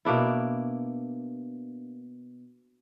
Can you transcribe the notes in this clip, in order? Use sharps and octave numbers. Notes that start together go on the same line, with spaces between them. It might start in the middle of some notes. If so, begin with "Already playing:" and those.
B2 A#3 D4 E4